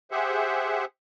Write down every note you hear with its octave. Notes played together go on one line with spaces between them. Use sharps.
G4 G#4 C5 E5 F#5